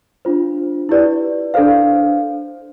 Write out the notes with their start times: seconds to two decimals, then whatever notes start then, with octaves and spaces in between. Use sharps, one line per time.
0.25 D4 F4 C5
0.89 E4 G4 B4 D5
1.54 D4 A4 C5 F5